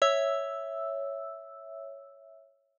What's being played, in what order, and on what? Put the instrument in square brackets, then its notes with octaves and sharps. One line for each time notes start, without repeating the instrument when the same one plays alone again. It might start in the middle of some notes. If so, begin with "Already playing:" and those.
[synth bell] C#5 E5 E6